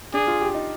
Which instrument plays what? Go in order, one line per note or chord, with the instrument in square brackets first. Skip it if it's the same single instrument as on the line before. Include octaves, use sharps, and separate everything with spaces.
[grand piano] D4 [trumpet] G#4
[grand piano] F4
G4
D#4